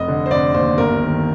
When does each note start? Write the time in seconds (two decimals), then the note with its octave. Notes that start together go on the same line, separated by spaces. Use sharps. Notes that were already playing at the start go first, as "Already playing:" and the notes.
Already playing: F1 D#5
0.08 D3
0.26 C5
0.31 F1 D5
0.54 D#2 C5
0.78 G1 A#4
1.02 D#3